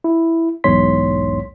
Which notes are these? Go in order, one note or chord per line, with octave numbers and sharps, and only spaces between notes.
E4
B1 E2 G#2 C#5 C6 B6